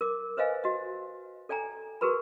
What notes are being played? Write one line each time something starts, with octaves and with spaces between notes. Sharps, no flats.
A#4 D6
B4 C5 D#5 F5 G#5
F#4 D#5
A4 D5 G5 G#5 A#5
F#4 G#4 A#4 B4 B5